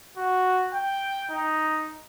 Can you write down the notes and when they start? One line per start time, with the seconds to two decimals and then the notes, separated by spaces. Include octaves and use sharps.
0.17 F#4
0.74 G5
1.31 D#4